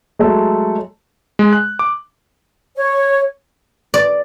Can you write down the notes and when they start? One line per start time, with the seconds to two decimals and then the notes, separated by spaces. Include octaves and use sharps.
0.19 F#3 G#3 A3 A4
1.39 G#3
1.53 F#6
1.79 D6
2.76 C#5
3.94 D5